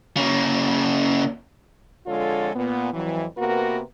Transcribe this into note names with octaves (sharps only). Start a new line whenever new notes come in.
C#3 A#3
F2 D3 G#3 F4 A4 C#5
A#2 B3
F2 E3 F#3
C3 A#3 B3 F#4 A#4 B4